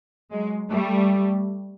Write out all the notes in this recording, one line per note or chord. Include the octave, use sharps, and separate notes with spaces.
F#3 G#3
G3 A3